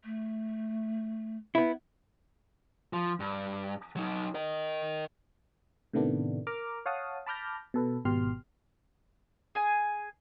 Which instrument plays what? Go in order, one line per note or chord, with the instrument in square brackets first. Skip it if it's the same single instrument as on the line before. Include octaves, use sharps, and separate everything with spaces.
[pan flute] A3
[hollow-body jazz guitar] B3 E4
[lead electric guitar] F3
G2
F#3 D#4
A#4 D#5
[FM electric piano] A2 C3 D#3 A3 B3 D4
A#4 A#5 D6 F6
C#5 F5 F#5 A5 D#6
A5 B5 D6 F6 G6 A#6
B2 A4 B4
G#1 B2 G4 C6 F6
[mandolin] G#4 G#5